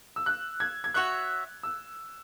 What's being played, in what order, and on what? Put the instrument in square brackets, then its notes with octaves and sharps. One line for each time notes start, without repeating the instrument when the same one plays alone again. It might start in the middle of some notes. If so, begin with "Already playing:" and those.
[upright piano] E6
F#6
G#6
G#6
[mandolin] F#4 C#5 E5 [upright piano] F#6
[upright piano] E6